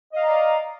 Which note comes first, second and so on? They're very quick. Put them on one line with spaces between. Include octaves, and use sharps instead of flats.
D#5 F5 A#5 D5